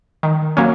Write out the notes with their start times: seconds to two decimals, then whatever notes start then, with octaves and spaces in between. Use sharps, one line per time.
0.23 D#3
0.57 F#3 A#3 C#4